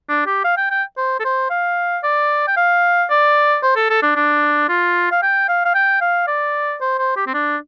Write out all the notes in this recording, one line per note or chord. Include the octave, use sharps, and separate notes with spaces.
D4
G4
F5
G5
G5
C5
A4
C5
F5
D5
G5
F5
D5
C5
A4
A4
D4
D4
F4
F5
G5
F5
F5
G5
F5
D5
C5
C5
G4
C4
D4